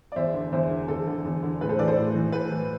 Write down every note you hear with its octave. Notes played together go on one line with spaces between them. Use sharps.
D5
E2 C5 E5
D3
E2 C5 E5
D3
E2 A4
D3
E2
D3
A2 B4
A4 C5
E3 B4 D5
A4 C5
A2
E3
A2 B4
E3